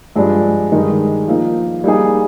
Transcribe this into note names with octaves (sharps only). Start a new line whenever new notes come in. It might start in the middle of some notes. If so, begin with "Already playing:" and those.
G2 F3 G#3 D4
G2 D#3 G#3 D#4 A#4
F3 A#3 D#4
G3 A#3 D#4 G#4